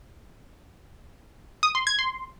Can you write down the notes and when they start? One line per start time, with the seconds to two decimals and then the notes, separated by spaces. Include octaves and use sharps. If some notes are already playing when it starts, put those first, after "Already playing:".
1.63 D#6
1.75 C6
1.87 G#6
1.99 C6